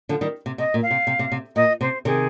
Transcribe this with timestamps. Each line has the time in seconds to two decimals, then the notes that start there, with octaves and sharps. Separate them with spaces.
0.09 D3 F3
0.21 D#3 G3
0.46 C3
0.58 C3 D#5
0.74 A#2
0.82 F5
0.91 C3
1.07 C3
1.19 C3
1.32 C3
1.56 A#2 D#5
1.81 C3 C5
2.05 C3 D#3 G#4